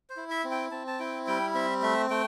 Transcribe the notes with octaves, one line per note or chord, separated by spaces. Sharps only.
C5
E4
E5
C4
G5
C4 A5
A5
E4 G5
G3 G5
C4 E5
A3 E5
A3 G5